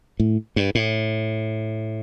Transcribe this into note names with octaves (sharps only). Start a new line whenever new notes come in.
A2
G2
A2